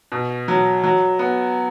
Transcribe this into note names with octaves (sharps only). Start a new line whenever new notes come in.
B2
F#3
F#3
B3